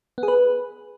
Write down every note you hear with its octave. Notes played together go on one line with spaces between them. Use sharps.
B3
G#4
B4